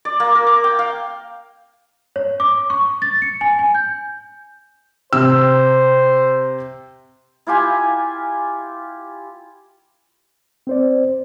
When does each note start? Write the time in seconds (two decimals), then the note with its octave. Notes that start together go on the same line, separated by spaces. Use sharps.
0.05 D5
0.20 A#3
0.35 A#4
0.47 D6
0.64 G5
0.79 F5
2.16 C#5
2.40 D6
2.70 C#6
3.02 A6
3.22 C#7
3.41 G#5
3.59 G#5
3.75 G6
5.13 C3 C5 E6
7.47 E4 F4 G4 G#5
10.67 C4 C5 D5